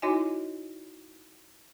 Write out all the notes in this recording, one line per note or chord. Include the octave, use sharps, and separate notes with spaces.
D#4 E4 F#4 C#5 D#5 G#5